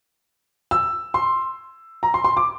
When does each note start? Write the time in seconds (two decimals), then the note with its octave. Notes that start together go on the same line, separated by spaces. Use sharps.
0.71 E6
1.14 C6
2.03 A#5
2.14 C6
2.24 C6
2.37 D6